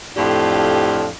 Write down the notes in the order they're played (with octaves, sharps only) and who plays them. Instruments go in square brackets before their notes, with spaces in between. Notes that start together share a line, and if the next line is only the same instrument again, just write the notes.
[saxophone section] F2 A2 D4 F4 G4